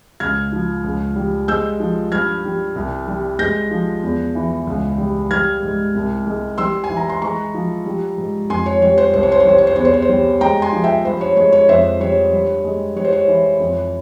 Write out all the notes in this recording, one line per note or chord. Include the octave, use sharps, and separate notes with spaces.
C#2 F6 G#6
F3
C#2
G3
G#3 E6 G6
F3
G2 F6 G#6
G3
C2
G3
G#3 G6 A#6
F3
E2
E3
C#2
G3
G3 F6 G#6
G#2
C2
G#3
G3 C6 E6
G#5
E3
A#5
C6
G#3 A#5 C#6
F3
G3
G#2
F2 G#5 C6
C#5
G3 C#5
C5
C2 C5
C#5
C5
C#5
G3 C5
C#5
C5
E2 C#5
C5
C#5
C5
G3
G#3 G5 A#5
G#5 C6
F3
E5 G5
G2 C5
C#5
G#3 C#5
C#5
F2 C5 E5
G3 C#5
G2
G#3
G3 C#5
C5
C#5
E3
F2